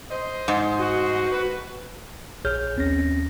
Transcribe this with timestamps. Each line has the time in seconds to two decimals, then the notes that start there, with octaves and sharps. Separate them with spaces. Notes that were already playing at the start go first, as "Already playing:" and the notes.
0.10 C5 D#5
0.48 G#2
0.79 F#4
1.32 B4
2.45 A#1 G#4 C#5 F6 G6
2.76 D#2 C4 C#4 A#6